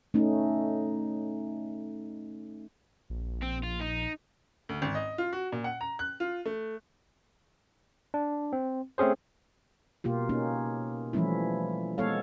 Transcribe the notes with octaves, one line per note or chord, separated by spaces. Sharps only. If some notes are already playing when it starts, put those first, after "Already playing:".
A3 C#4 D#4
A#1
C4
F4
D#4
D2
G#1
D#5
F4
F#4
A#2
F#5
A#5
F#6
F4
A3
D4
C4
A3 C4 C#4 G#4 C5
B2 A#3 F4 G4
A#3 C#4 D#4
E3 F3 G3 A3 C#4 E4
G#3 B3 A4 C#5 F5